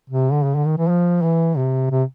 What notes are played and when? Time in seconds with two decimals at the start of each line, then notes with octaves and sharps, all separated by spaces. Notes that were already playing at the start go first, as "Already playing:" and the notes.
0.10 C3
0.32 D3
0.44 C#3
0.55 D3
0.66 D#3
0.78 E3
0.88 F3
1.22 E3
1.57 C3
1.91 C3